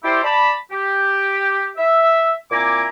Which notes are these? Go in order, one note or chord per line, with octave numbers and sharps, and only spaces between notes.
E4 G4 C5 D5
D5 A5 B5
G4
E5
A#2 C4 E4 G#5 A#5 D6